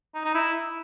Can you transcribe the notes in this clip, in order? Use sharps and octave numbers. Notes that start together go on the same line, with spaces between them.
D#4
D#4
E4